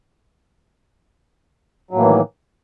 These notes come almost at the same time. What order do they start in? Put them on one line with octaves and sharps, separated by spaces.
F#3 A2 A#3 E3 D#3